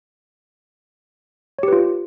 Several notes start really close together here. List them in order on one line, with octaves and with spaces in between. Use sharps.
C#5 G4 B4 F4